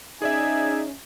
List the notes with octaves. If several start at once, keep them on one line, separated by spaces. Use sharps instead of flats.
C#4 D#4 G#4 D5 E5 G#5